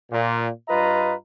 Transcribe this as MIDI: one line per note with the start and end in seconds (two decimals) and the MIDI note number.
0.11 0.48 46
0.68 1.13 43
0.68 1.13 65
0.68 1.13 71
0.68 1.13 75
0.68 1.13 82